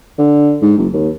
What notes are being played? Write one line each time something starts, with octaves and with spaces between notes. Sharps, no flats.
D3
G#2
F#1
D#2